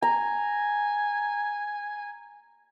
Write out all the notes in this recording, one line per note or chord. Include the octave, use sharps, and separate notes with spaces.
G#5 A#5